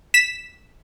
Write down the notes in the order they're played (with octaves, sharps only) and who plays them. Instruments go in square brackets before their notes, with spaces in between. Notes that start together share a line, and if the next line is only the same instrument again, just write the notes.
[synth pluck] B6 E7